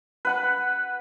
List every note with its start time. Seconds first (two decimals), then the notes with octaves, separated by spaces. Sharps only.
0.25 B4 F#5 B5